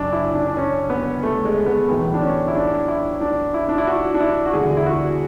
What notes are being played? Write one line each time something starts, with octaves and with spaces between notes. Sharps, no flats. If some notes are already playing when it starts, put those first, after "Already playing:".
Already playing: F#1 F#2 F#3 D4
E4
D4
D4
C#4
B3
A3
G#3
B3
B1 A2 E3 B3
D4
C#4
E4
D4
E4
D4
E4
D4
E4
F#4
D4
E4
F#4
E1 D2 D3 G#4
E4
F#4